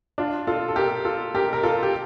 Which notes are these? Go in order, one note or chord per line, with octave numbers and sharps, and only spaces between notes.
D4 F4
F4 A4
A4
G4 A#4
F4 A4
G4 A#4
A#4
F4 A4
G4